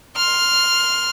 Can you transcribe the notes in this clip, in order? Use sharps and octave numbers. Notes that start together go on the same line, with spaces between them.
C6 F6